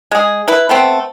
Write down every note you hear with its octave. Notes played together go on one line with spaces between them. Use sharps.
G#3 G#4
E4 B4
A3 B3 C4